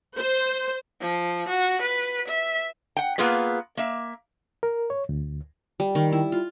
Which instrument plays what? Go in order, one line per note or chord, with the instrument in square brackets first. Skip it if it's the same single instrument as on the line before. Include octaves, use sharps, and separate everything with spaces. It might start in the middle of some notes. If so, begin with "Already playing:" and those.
[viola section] C5
[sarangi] F3
F#4
B4
E5
[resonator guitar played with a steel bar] F#5 G5
A#3 B3 F4 G#4 B4
A#3 E5
[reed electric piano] A#4
C#5
D2
[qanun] G3
D#3
E4
F4